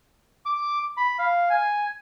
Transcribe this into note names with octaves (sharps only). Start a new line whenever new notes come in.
D6
B5
F5
G#5